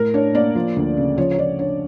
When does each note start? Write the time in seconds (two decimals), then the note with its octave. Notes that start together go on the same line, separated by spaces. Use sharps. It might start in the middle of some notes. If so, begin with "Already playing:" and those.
Already playing: A2 A#4
0.14 D4 C#5
0.34 A#3 D5
0.55 F3
0.76 D2
0.97 C#3
1.18 F3 C#5
1.31 C#5
1.38 F3 D5
1.59 D4 C#5